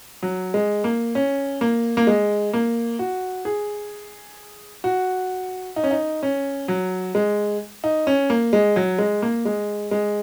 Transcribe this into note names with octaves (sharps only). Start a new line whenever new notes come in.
F#3
G#3
A#3
C#4
A#3
A#3
G#3
A#3
F#4
G#4
F#4
D#4
C#4
D#4
C#4
F#3
G#3
D#4
C#4
A#3
G#3
F#3
G#3
A#3
G#3
G#3